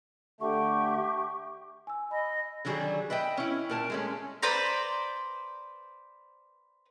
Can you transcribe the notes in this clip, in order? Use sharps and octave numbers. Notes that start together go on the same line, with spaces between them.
D3 A3 G4 C#6
G#5 E6
D#5 B5
D3 D#3 F#3 G3 G#4
B4 D#5 E5 G5
C#4 E4
A#2 A#4 A5
G#3 A3 C#4
B4 C5 D5 A#5